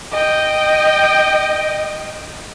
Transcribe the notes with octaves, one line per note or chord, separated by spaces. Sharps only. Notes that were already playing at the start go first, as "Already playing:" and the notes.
D#5 G5